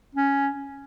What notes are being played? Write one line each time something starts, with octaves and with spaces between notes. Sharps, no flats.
C#4